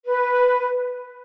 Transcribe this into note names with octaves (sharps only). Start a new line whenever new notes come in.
B4